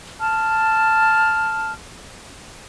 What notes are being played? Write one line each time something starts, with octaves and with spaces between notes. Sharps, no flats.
A5 F6